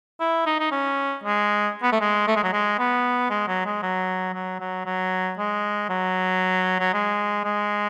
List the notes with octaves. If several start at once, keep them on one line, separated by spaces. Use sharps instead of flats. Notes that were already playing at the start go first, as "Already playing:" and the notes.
E4
D#4
D#4
C#4
G#3
B3
A3
G#3
A3
G#3
F#3
G#3
B3
G#3
F#3
G#3
F#3
F#3
F#3
F#3
G#3
F#3
F#3
G#3
G#3